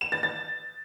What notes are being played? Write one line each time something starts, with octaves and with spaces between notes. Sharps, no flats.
E7
A6
A6